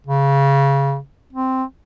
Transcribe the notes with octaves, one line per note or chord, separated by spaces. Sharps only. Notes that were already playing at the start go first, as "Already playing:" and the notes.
C#3
C4